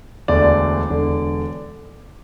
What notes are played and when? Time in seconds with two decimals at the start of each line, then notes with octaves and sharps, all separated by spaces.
0.28 E1 D2 D3 D5
0.90 E1 D3